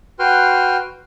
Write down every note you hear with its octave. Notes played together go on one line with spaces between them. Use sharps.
F#4 B4 G5 C6 F6